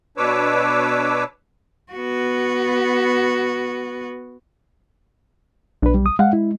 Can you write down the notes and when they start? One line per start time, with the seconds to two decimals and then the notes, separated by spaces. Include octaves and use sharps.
0.17 B2 D4 B4 C#5 D6 E6
1.92 B3 F#4
5.82 B1 D4 B4
5.94 G3
6.06 D#6
6.19 G#3 F5 F#5
6.33 E4